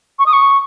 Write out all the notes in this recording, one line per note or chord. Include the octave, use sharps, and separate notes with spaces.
C#6
D#6
C#6